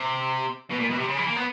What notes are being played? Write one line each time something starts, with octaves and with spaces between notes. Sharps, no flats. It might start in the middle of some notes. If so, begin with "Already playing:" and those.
Already playing: C3
B2
A#2
B2
C3
C#3
E3
A#3
B3